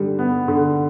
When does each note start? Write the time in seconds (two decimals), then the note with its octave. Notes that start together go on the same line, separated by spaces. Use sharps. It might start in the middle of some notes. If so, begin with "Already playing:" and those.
Already playing: D3 G3
0.19 B3
0.48 D3